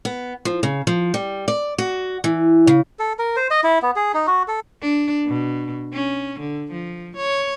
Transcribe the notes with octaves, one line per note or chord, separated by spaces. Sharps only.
B3
F3
C#3
F3
G3
D5
F#4
E3
C#3
A4
A#4
C5
D#5
E4
B3
G#4
D#4
F#4
A4
D4
B2
C#4
D3
F3
C#5